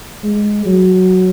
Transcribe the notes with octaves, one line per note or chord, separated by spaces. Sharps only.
G#3
F#3